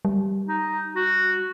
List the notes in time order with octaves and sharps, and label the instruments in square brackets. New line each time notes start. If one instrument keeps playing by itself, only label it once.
[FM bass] G3
[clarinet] D#4
F#4